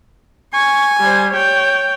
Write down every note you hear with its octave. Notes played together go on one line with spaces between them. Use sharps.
G#5 C#6
G3 C5
C#5 G5